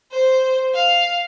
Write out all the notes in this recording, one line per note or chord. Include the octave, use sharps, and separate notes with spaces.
C5
F5